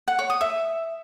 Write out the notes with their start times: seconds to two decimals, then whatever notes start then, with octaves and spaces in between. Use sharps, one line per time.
0.08 F#5
0.19 C#5
0.30 D#6
0.41 E5